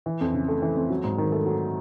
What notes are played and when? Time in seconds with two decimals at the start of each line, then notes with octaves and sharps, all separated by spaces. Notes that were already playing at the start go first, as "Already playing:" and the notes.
0.06 E3
0.21 F2
0.33 C#3
0.48 A3
0.62 E3
0.77 F2
0.90 F#3
1.04 G#2
1.18 D#3
1.32 A3
1.46 F#3